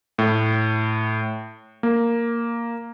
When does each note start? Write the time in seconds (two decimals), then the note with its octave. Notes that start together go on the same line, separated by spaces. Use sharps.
0.18 A2
1.83 A#3